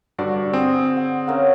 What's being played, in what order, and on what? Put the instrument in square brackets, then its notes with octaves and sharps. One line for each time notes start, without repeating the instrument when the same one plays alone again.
[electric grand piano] G2 F#4 D5 [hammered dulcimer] D3
[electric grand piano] C4 [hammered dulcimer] G#4
[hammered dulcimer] F#5
C#3 A#4 F#5